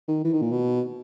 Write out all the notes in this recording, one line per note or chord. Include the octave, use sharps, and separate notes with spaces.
D#3
E3
D#3
A#2
B2